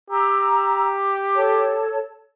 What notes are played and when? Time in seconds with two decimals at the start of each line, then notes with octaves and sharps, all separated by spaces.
0.10 G4 A#5 E6
1.35 A4 C#5 A5